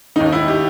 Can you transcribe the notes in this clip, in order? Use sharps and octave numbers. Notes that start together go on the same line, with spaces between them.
D#2 D#3 D#4
D#4
E4
G4